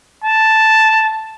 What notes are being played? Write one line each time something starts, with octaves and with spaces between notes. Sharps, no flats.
A5